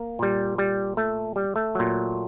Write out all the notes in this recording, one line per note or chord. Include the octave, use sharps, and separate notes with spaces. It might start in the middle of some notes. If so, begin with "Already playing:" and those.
Already playing: A#3
A#2 G3
G3
A3
G3
A3
A#2 F#3